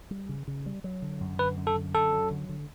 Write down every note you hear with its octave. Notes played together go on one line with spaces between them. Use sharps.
G3
C#3
C#3
G3
F#3
D3
F#2
D3 B4
F#2
A4
D3
F#2 A4
F#3
D3
D3